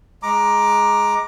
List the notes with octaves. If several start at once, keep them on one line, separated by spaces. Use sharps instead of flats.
G#3 A#5 D6